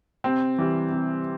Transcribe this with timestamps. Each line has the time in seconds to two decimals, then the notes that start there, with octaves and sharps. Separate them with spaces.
0.24 C3 C4
0.58 E3 G3
0.92 C3